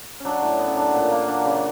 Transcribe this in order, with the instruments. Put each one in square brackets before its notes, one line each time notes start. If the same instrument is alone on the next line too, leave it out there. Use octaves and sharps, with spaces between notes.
[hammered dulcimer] F#3 C#4 D4
A2
B3
C#4
F#3 D4
A#2
A#3
F#3 D4
C#3